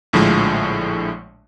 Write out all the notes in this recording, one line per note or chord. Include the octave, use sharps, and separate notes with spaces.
A#1 A2 D3 F3 G#3